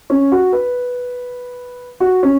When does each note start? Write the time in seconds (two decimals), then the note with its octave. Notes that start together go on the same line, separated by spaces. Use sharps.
0.10 C#4
0.32 F#4
0.53 B4
2.00 F#4
2.23 C#4